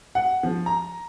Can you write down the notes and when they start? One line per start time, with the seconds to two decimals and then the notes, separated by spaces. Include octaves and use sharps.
0.15 F#5
0.43 F3
0.66 A#5